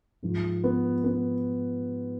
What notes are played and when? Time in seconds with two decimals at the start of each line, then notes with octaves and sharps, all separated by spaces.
0.23 G#2 F3
0.64 B3
1.04 B3